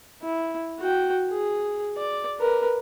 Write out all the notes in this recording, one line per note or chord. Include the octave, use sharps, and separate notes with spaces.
E4
F#4 G5
G#4
D5
A#4 B4